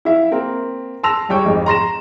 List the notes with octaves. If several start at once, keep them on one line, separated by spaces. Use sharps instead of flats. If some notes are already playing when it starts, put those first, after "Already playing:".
E4 E5 F5
A#3 C4 A#4
A5 C6 E6 A#6 F7
E1 G3 C#5 G5 C#6
G#1 F2 G#2
A#5 C6 A#6 E7